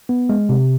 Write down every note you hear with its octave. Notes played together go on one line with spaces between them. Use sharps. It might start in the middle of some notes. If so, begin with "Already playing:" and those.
B3
G#3
C3